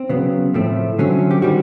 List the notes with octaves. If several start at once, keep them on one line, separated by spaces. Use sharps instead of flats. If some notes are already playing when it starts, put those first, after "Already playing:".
Already playing: C4
C#3 F#3 B3
A2 F3 A3 C4
D3 F#3 A3 C4 C#4
G4
D#3 G3 C4 F#4